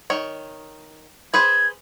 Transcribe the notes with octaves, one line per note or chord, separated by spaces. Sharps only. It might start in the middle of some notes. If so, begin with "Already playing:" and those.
D#3 C#5
G#4 B4 C5 G#6